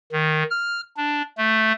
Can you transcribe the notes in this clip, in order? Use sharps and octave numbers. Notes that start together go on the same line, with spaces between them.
D#3
F6
D4
A3